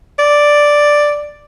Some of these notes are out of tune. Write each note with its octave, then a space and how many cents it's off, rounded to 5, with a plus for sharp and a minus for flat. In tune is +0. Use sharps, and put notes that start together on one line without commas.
D5 +0